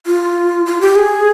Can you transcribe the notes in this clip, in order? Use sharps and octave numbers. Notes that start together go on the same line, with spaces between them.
F4
F4
G4
G#4